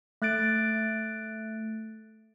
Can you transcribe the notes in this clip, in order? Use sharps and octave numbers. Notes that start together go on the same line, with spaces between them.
A3 F#6 A6 D7